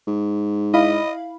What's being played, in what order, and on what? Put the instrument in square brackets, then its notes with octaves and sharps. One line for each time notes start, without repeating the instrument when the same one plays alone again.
[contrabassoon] G#2
[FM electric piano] E4 F5 B5 [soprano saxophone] D#5